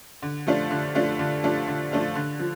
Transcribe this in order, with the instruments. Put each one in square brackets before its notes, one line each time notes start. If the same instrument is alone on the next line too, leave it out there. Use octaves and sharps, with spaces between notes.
[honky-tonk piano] D3
F3 A3 D4 F4
D3
F3 A3 D4 F4
D3
F3 A3 D4 F4
D3
F3 A3 D4 F4
D3
F3